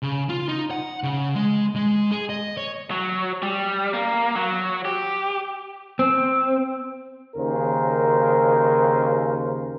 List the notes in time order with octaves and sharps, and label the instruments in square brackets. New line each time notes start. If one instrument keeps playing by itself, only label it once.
[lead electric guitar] C#3
F4
D#4
F#5
C#3
G#3
G#3
G#4
D#5
C#5
F#3
G3
A#3
F#3
G4
[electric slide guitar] C4
[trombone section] D#2 C#3 A#4 C5